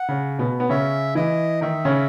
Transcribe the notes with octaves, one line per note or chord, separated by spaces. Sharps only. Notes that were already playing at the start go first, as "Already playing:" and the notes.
Already playing: F#5
C#3
B2 B3
B3
C#3 C#4 E5
E3 E4 D#5
D#3 D#4 E5
C#3 C#4